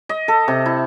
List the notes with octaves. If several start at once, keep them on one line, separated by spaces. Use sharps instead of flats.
D#5
A4
C3
E4